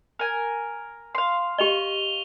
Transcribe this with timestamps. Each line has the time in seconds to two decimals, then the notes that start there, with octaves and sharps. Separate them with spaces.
0.19 A#4 G#5
1.15 F5 C6
1.58 G4 D#5 C#6 F7 G7